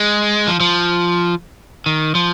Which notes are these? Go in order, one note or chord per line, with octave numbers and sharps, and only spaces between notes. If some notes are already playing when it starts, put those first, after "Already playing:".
Already playing: G#3
F3
F3
D#3
F3